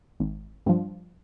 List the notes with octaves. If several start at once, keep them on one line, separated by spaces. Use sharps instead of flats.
G#1
G2 F3